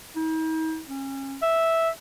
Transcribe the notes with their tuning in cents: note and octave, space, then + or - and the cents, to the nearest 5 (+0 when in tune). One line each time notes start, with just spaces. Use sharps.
D#4 +45
C#4 -30
E5 -5